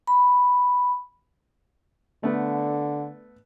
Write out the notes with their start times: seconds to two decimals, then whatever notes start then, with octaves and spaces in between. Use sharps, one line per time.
0.07 B5
2.23 D3 A3 B3